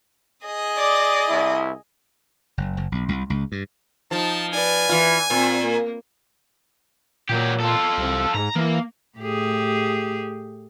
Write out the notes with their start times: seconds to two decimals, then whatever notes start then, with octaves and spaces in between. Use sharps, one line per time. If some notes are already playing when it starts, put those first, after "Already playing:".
0.45 G#4 D#5
0.78 D5
1.29 C2 E4
2.58 F#1
2.77 F#1
2.92 B1
3.09 C2
3.30 C#2
3.52 G2
4.11 F3 D#4 A5
4.53 B4 D5 G#5
4.89 E3 F4
5.30 A#2 C4
5.62 A#3
7.29 A#2 F#3 G4
7.61 F4 A4
7.98 C2
8.34 G#2 A#5
8.55 E3 A#3
9.19 A2 G4 G#4